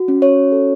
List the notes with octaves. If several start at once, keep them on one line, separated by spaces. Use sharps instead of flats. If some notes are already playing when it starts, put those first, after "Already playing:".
Already playing: F#4
C#4
C#5
A4